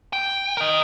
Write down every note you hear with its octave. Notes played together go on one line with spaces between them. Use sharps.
G5
A#4 D#5